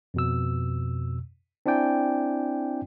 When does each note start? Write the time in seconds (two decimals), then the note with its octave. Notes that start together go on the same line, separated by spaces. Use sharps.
0.14 F2 B2 E6
1.66 C4 D4 E4 D5 G5 G#5